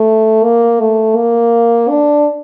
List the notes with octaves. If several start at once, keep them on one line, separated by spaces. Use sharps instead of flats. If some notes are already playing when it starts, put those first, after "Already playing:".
Already playing: A3
A#3
A3
A#3
D4